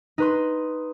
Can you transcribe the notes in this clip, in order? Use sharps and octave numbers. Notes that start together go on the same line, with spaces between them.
D#4 B4 C6